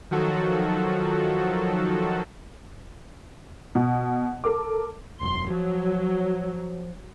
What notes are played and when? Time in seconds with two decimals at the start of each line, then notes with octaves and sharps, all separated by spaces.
0.11 D#3 F3 F#3 F#4 A4
3.75 B2
4.44 A4 A#4 D6
5.21 E1 F#2 C6
5.50 F3 F#3